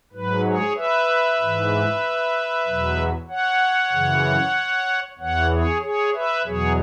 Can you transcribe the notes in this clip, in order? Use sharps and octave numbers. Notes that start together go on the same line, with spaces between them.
G#2 F#3 B4
G#4 C#5
B4 E5
G#2 E3
E2 B2 F#3
C#5 F#5
F#2 C#3 E3
E2 E3 C#5 F#5
G#4 C#5
G#4 C#5
B4 E5
E2 B2 F#3 G#4 C#5